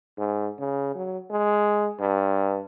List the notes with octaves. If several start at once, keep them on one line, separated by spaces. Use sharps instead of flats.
G#2
C#3
F#3
G#3
G2